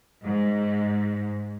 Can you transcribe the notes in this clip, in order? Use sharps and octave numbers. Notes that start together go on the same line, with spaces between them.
G#2